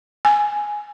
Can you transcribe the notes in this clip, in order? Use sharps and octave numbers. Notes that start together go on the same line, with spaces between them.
G#5